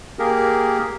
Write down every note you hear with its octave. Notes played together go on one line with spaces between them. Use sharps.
A#3 G4 G#4 A#4